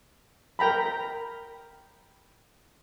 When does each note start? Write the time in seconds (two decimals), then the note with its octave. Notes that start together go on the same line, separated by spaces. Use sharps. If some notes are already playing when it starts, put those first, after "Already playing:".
0.59 A#4 G5 A#5 B5